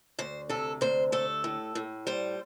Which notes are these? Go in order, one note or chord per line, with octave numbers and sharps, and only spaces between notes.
D2 C5
C3 A4
D2 C5
A3 A4
A2
A2
G3 C5